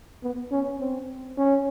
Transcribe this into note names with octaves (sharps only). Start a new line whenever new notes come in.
B3
C#4
C4
C#4